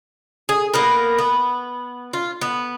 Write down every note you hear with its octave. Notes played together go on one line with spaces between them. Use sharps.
G#4
A#3 B3 A#4
B3
F4
B3